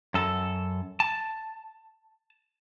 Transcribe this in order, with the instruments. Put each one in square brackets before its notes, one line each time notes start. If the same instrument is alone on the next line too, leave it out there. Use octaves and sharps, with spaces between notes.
[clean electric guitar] F#2 A4
A5